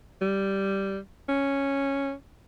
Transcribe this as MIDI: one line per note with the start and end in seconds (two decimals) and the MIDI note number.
0.22 0.98 55
1.29 2.13 61